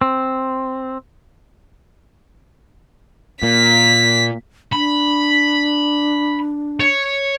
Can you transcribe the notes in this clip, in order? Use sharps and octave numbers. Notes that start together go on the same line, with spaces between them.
C4
A#2 B6
D4 B5
C#5